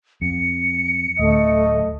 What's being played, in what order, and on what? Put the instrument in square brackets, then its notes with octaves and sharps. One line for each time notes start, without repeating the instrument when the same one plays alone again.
[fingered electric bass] F2 [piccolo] C#7
[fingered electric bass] D1 D2 [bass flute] A3 [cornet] D#5